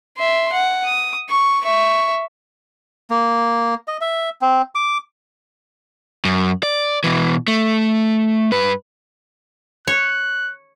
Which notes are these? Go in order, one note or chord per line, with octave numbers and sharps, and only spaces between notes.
E5 C6
F#5
D#6
C#6
E5 C#6
A#3
D#5
E5
C4
D6
F#2
D5
B2 E3
A3
G2 B4
C#5 F#6